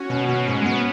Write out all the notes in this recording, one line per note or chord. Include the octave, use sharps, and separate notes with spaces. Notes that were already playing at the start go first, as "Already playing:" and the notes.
Already playing: C#4 F#4
B2
B2
G#2
G#3
B3